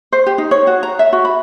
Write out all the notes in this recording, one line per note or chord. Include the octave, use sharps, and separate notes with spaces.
C5
G4
D#4
C#5
F#4
A#5
E5
F#4
B5